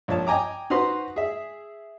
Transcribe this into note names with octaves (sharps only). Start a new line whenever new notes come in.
A#1 F3 C#5 A5
D#5 G5 G#5 A#5 D6
D#4 F#4 B4 C5 C6
G#4 E5